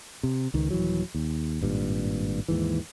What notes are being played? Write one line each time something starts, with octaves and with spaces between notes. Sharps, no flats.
C3
C#2 D#3
D#1 E3 F#3
D#2
G#1 G2 A#2
D#2 G#2 E3